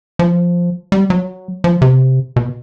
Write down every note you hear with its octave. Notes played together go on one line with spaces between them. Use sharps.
F3
G3
F#3
F3
C3
B2